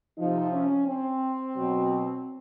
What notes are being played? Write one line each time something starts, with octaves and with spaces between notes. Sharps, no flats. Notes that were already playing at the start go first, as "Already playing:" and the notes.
C3 F3 D#4
C#4
C4
B2 F#3